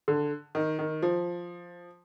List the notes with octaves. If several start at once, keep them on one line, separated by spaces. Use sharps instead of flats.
D3
D#3
D#3
F3